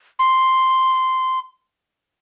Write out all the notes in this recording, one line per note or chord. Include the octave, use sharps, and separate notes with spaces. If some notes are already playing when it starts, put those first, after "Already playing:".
C6